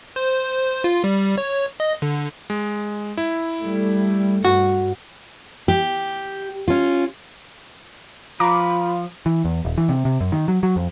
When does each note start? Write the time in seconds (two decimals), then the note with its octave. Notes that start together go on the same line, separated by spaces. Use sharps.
0.16 C5
0.84 F4
1.04 G3
1.38 C#5
1.80 D#5
2.02 D3
2.50 G#3
3.17 E4
3.62 G3 A3
4.45 G2 F#4
5.68 G4
6.68 C#4 F4
8.40 F3 F4 A#5 B5 D6
9.26 E3
9.45 E2
9.65 D#1
9.78 E3
9.89 C3
10.05 C3
10.21 F#2
10.32 D#3
10.48 F#3
10.63 F#3
10.76 F2